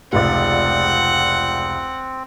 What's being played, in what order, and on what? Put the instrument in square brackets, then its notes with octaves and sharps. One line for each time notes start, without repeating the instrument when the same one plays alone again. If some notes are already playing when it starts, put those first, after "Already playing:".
[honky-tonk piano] F1 C#2 D5 [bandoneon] C4 [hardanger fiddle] F#5